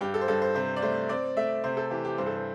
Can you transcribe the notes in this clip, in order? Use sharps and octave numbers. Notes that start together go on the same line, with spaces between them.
G2 G4
A4
C5
G2 A4
C5
C3 C5
D5
A3 C5
C4 D5
A3 E5
C3 C5
A4
E3 G4
G4
G2 C5
A4
C5